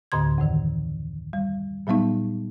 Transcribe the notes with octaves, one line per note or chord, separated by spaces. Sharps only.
D2 A2 D3 C6 G#6
F2 A2 D#3 E3
G3
A#2 F#3 G3 B3 D#4